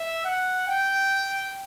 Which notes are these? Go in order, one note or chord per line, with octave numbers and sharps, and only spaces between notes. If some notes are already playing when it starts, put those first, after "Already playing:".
Already playing: E5
F#5
G5